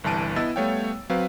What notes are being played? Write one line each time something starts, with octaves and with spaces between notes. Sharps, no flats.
G1 C2 E3 A5 D7 D#7
B3 E4 D#5 E6 A6
G3 A3 B3 C#5 F5 G5
F#3 C4 B4 F5